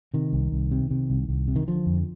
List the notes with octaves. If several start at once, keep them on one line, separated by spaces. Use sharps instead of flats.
C3 D#3
C2
C2
C3
C3
C2
C2
C3
D#3
D3 F3
F2